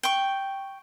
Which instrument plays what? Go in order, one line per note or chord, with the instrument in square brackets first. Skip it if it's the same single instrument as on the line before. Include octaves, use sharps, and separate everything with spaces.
[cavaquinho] G5 C#6